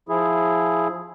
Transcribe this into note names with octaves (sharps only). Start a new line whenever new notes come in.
F3 E4 G#4